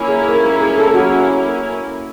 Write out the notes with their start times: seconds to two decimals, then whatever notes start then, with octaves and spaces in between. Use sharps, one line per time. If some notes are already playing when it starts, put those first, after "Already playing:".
Already playing: A#3 C#4 E4
0.08 G#4
0.29 A#4
0.46 A#4
0.61 G#4
0.78 A4
0.94 F#4